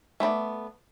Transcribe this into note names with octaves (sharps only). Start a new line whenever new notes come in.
A3 B3 C5 D5